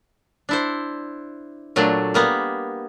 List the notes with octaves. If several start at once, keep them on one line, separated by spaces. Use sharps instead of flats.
D4 E4 C5
A#2 F#3 A3 D4
G3 A#3 B3